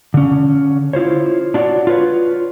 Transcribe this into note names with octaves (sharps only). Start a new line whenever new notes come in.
D3 C#4
E4 F4 C5 C#5
D4 F4 F#4 C#5 D5
F4 B4 C#5